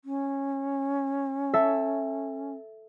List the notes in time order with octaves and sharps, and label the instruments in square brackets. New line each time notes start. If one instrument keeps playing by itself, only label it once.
[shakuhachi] C#4
[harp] A4 E5 A5